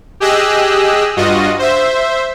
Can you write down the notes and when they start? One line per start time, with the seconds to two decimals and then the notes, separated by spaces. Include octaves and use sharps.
0.20 G4 G#4 D#5 E6 F#6
1.16 G2 F4 F#4 D#5
1.59 C5 E5